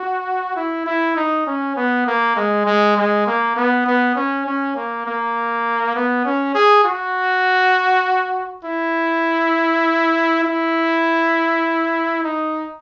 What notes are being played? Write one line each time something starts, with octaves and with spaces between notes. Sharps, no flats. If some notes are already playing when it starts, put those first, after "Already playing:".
Already playing: F#4
E4
E4
D#4
C#4
B3
A#3
G#3
G#3
G#3
A#3
B3
B3
C#4
C#4
A#3
A#3
B3
C#4
G#4
F#4
E4
E4
D#4